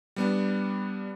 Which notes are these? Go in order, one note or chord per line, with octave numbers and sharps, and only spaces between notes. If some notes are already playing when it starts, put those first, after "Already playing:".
G3 B3 D4